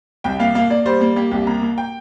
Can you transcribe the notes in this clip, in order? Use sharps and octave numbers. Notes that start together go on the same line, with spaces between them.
C2 G5
A#3 F5
A#3 F5
A#3 D5
G3 C5
A#3
A#3 G4
C2 G4
A#3 A#5
A#3
G5